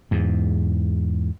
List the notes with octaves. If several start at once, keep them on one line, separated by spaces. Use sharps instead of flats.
E2 G#2